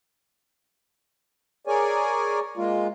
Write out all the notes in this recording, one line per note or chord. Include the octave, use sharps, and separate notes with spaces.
G#4 A#4 C#5 D5 G#5
G#3 A#3 F4